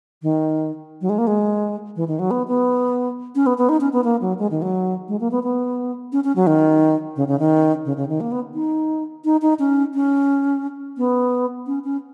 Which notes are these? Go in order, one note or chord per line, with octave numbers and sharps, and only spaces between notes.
D#3
F#3
G#3
A#3
G#3
E3
D#3
F#3
B3
B3
C#4
B3
B3
D#4
C#4
B3
A#3
F#3
G#3
D#3
F#3
G#3
A#3
B3
B3
C#4
C#4
F#3
D#3
C#3
C#3
D#3
C#3
C#3
D#3
A#3
B3
D#4
D#4
D#4
C#4
C#4
B3
C#4
C#4